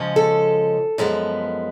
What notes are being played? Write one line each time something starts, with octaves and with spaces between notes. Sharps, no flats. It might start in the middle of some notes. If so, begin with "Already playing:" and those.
Already playing: C#3 F3 G#3 C#4
A4
F#2 F3 G#3 B3